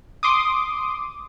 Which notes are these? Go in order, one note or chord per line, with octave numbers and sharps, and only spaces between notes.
C6 D6 D#6